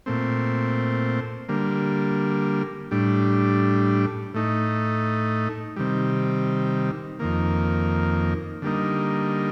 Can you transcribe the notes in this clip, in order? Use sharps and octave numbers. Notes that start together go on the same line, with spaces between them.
A#2 A3 C4
D3 G3 A#3
A2 G3 D4
A2 A3 D#4
C3 D#3 G3
F2 D#3 A#3
D3 G3 A#3 D#4